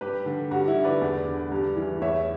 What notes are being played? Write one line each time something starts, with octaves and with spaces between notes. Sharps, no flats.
G2 G4 B4
D3
G2 F#4
E4
D3
B4 D5
E2
D3
G2
E3
E2 C#5 E5